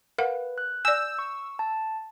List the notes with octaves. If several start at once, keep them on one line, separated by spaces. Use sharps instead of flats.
A#4 B4 F5 F#5
F#6
D5 G#5 E6 G6
C#6
A5